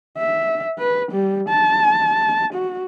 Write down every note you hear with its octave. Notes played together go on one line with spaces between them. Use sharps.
E5
B4
G3
A5
F#4